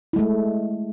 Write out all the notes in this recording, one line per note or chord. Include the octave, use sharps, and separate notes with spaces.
G#3 A3 E4